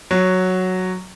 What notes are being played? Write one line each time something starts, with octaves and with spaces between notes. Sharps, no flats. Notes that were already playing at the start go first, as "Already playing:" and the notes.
F#3